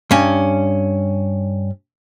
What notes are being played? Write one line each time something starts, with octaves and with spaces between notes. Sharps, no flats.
G2 C#4